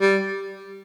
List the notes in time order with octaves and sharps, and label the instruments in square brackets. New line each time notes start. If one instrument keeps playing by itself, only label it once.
[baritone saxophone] G3